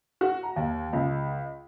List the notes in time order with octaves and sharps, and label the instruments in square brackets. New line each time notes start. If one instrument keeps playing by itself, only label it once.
[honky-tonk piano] F#4
A#5
D#2
C#2